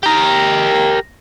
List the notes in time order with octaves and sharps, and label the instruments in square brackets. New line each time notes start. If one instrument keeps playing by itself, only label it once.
[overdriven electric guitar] G4 A#4